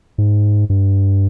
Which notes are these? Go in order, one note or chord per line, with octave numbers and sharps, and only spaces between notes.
G#2
G2